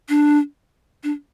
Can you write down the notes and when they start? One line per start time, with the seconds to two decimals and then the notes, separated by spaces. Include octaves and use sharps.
0.09 D4
1.03 D4